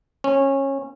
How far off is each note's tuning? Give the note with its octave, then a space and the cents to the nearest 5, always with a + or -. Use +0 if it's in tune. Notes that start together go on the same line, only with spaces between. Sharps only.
C#4 -20